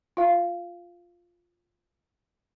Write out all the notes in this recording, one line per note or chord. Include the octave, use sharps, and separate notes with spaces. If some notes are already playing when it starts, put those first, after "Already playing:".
F4 F5